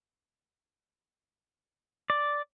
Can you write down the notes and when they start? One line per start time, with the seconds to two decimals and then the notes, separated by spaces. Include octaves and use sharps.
2.10 D5